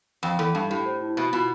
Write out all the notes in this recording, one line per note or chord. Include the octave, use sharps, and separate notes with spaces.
F2 G5
E2 A4
G2 A5
A2 G4
C5
E4
B2 E5
B2 F4